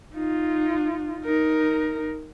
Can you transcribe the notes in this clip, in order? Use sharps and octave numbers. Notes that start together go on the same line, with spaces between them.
D#4 F4
D#4 A#4